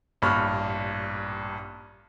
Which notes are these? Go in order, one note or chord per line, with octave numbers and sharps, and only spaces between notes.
A1 G2 A#2 B5 C#6 F6